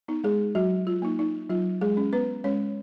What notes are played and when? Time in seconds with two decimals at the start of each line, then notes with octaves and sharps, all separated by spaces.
0.08 B3 D#4
0.24 G#3 G#4
0.55 F#3 F#4
0.87 F4
1.02 A#3 D#4
1.19 D#4
1.49 F#3 F4
1.81 G#3 G#4
1.97 C#4
2.13 B3 B4
2.44 G#3 C#4 C#5